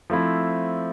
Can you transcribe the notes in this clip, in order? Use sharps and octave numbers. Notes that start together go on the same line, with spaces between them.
F3 A3 C4 E4